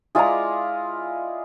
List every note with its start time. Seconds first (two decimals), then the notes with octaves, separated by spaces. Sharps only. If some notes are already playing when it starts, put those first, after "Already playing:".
0.15 G#3 E4 F4 G#4 D5 A#5